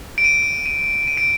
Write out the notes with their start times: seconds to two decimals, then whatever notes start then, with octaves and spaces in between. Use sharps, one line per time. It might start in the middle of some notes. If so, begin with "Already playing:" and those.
0.18 D7
0.24 D#7
0.66 D#7
1.07 D#7
1.17 D7